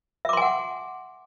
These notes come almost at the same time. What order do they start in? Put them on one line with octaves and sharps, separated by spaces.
E5 D6 C6 G#5 F#5